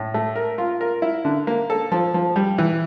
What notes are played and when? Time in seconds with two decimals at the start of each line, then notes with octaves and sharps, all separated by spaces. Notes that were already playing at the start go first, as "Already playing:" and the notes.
Already playing: A2
0.14 A3
0.36 A#4
0.58 F4
0.81 A#4
1.02 E4
1.25 D3
1.47 A#3
1.70 A4
1.92 F3
2.14 F3
2.36 G3
2.58 E3